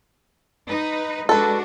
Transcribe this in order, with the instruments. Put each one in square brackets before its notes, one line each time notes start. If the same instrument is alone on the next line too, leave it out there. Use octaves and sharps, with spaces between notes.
[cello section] D#4 B4
[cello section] G#3 D4 F#4 [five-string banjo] A4 B4